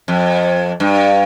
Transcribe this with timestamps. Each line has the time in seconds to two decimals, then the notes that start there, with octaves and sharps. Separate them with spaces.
0.08 F2
0.80 G2